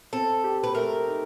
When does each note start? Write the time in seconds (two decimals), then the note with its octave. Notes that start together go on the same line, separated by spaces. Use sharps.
0.13 C4 A4
0.44 G4
0.64 B4
0.75 A3 A#4
1.06 D#4